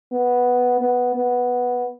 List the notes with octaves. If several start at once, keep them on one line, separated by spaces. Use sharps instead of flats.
B3
B3
B3